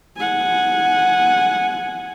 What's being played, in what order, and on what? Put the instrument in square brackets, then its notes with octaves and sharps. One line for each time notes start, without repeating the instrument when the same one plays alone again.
[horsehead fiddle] F#5 G#5